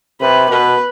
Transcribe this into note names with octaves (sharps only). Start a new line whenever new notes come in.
C3 B4
B2 B4